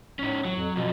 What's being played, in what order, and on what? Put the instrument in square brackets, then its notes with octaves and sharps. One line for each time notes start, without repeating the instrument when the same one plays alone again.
[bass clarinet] A2 [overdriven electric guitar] C#4 D#4
[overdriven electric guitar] F#3
[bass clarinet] F2
[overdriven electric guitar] F#2 F3 [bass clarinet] B2